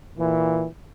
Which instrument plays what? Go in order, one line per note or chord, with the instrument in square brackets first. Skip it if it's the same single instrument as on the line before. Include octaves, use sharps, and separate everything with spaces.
[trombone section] A#2 E3